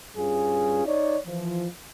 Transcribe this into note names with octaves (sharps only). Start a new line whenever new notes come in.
G2 C#4 F4 G#4
D#4 C#5 D5
E3 F3